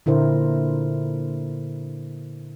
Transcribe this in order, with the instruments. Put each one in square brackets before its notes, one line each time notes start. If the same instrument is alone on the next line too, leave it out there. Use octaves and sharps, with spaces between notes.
[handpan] A#2 D3 E4 A#4 C5